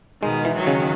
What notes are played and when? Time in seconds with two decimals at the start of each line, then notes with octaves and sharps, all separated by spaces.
0.22 B2 D#3 G#3
0.45 E3
0.55 D#3 F#3
0.67 C#3